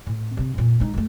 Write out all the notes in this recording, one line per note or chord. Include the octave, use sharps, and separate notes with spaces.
A2
C3 C4
F2 A#2
G#3 D#4
F#2 A3